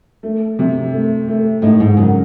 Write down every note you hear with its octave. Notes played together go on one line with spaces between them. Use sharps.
A3
C3
A3
A3
A2 D#4
G#2
F#2 C#3